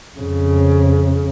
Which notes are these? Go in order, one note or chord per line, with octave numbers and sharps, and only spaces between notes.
F2 C#3